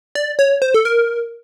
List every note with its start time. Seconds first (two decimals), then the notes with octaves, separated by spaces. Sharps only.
0.15 D5
0.39 C#5
0.62 C5
0.74 A4
0.85 A#4